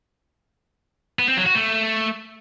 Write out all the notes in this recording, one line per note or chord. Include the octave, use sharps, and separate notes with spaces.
B3
C4
F#3
F#4
A3